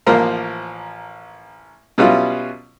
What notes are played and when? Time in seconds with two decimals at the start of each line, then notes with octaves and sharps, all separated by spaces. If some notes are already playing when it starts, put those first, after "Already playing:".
0.06 A1 F3 A#3 A#4 C5 A#5
1.98 B2 F#3 G3 C#4 E4 F4